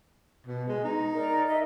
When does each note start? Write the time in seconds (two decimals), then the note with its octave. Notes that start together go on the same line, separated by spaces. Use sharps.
0.47 B2
0.68 G#3
0.84 D#4
1.15 A#4 D5
1.47 D#5 E5